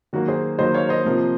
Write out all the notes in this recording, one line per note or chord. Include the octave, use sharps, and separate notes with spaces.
D#3 F#3 A#3 F#4
G#4 C5
D#3 F#3 A#3 C5 D#5
C#5 F5
C5 D#5
C3 F3 A#3